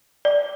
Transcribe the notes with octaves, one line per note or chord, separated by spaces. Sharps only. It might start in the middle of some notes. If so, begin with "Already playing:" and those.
D5